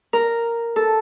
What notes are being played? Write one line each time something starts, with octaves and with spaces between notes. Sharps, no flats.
A#4
A4